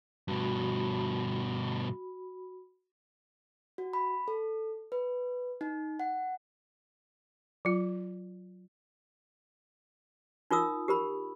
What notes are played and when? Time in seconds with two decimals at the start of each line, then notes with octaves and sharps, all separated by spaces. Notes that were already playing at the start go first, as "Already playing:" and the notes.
0.28 G2 B2 F#4 B5
3.78 F#4
3.93 B5
4.28 A4
4.92 B4
5.61 D#4
6.00 F#5
7.65 F#3 F4
10.51 D#4 F4 A#4 D#6 E6
10.88 G4 A#4 B5